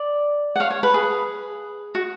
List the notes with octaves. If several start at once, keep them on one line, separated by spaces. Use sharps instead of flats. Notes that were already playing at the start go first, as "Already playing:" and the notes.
Already playing: D5
F#5
C#5 F5
C#5
B4
G#4
F#4